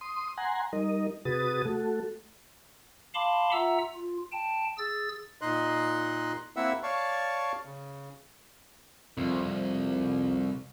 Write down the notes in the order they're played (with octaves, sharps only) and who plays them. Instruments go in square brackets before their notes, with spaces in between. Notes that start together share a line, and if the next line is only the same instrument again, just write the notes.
[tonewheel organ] C6 D#6
F#5 G#5 A#5 C6
G3 D#4 A#4 D#5
C3 F#4 G#4 B4 D#6 A6
A3 F#4 A4
[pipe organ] F5 A5 B5 C6 D6
F4 E5 F#5 A#5 E6
F4
G5 A5
G#4 E6 A6
[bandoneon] A#2 D#4 D#5 C6 F#6
A#3 C4 E4 E5 F#5 E6
C#5 D5 F5 A5 C#6
C#3
[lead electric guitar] C2 [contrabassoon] F2